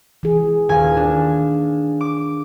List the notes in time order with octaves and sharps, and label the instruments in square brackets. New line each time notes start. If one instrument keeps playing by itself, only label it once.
[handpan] E3 G#4
[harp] D#1 G#5 [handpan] D#3 F5
[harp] D4
D6